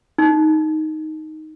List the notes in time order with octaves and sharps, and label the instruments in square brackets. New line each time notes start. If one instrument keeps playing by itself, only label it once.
[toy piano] D#4